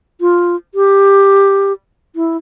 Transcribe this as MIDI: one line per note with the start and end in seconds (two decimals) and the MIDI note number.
0.21 0.56 65
0.75 1.73 67
2.16 2.37 64